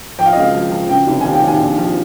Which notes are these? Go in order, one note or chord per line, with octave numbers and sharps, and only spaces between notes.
F3 G5
F5
D#5
C#2 F5
F3
F3
C#3 G5
F1
D#2 G#5
G5
D#2 G#5
A#1
F3